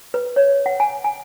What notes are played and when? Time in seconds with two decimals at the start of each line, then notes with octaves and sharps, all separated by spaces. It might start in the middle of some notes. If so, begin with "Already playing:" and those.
0.14 B4
0.36 C#5
0.66 F#5
0.80 G#5
1.05 G#5